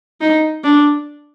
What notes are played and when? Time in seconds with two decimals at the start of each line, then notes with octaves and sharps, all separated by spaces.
0.21 D#4
0.64 D4